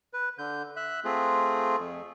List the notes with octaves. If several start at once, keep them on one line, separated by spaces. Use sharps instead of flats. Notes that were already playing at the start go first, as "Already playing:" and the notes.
B4
D3 G6
E5 F#6
A3 C4 F4 G#4
F2